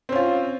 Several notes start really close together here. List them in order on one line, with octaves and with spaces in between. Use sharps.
C4 C#4 F4